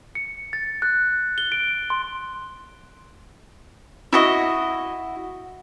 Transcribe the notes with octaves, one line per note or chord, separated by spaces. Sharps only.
C#7
A6
F#6
G7
D7
C6
E4 F#4 D#5